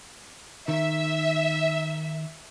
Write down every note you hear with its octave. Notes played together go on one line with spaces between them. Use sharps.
D#3 E5